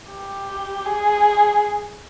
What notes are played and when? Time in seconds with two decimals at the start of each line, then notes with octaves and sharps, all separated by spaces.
0.10 G4
0.86 G#4